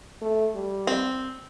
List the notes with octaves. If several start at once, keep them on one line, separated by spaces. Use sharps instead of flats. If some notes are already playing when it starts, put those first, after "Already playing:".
A3
G3
C4